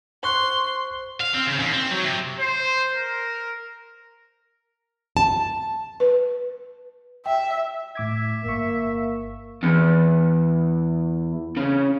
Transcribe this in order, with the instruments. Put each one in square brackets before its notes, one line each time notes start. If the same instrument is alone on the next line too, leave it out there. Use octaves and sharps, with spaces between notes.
[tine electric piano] C5 C#6 F#6 [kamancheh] C6
[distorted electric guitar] F5
C4
C#3
D#2
C4
F#3
C3
[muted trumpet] C5
A#4
[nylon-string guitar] A5
[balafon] B4
[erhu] E5 [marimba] G5
[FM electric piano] A2 D6 G#6 [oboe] E5
[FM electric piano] G1 C#6 [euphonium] A#3
[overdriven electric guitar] E2
C#3